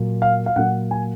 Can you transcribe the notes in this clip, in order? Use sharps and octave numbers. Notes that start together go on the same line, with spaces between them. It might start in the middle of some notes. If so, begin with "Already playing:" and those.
Already playing: A#2 F#3 A#3
F5
F5
A#2 F#3 A#3 F#5
G#5